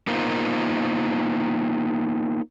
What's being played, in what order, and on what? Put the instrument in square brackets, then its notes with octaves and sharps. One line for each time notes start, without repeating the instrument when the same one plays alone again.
[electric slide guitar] A#3 B3 D#4 F4 A#4 C5